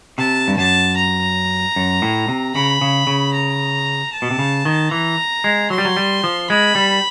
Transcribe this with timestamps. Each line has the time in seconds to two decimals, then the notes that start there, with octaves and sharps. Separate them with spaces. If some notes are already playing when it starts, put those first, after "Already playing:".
0.18 C3 A5
0.48 G2
0.57 F#2 A5
0.97 A#5
1.76 F#2
2.02 A2
2.28 C3
2.55 C#3 B5
2.81 C#3
3.07 C#3
3.33 A#5
4.13 A5
4.22 B2
4.31 C3
4.39 C#3
4.65 D#3
4.91 E3 A#5
5.44 G#3
5.70 F#3 C6
5.78 G3
5.85 F#3
5.97 G3
6.24 F3
6.50 G#3 B5
6.75 G3